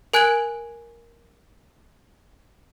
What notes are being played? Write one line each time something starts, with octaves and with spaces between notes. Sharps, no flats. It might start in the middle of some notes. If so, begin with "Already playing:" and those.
A#4 G#5 F#6 G#6 D7 F#7